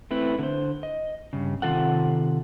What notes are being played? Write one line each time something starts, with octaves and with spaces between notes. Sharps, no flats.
A3 C4 E4 B4
D3 C5
D#5
G2 C#3
C3 D#3 F4 A4 F#5